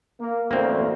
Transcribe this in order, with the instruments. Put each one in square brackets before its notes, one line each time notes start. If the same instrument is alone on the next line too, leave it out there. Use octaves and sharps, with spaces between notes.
[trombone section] A#3
[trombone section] A1 D2 [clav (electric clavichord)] A#3 C4